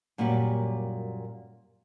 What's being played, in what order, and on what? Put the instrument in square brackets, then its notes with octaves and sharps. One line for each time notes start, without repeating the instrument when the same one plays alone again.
[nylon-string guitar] F#2 A#2 G3 F#4 G4